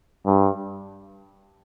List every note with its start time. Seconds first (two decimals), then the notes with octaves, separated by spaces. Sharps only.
0.26 G2